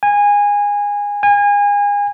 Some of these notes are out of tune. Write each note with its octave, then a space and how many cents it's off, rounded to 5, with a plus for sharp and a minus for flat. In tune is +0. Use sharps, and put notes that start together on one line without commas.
G#5 -20
G#5 -30